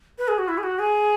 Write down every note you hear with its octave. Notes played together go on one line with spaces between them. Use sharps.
B4
G#4
F#4
E4
G#4
F#4
G#4